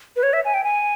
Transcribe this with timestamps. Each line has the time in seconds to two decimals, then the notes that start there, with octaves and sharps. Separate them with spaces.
0.16 B4
0.23 C#5
0.33 E5
0.45 G#5
0.54 G5
0.64 G#5